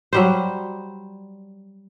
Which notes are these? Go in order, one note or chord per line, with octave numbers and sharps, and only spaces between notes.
F#3 G3 C5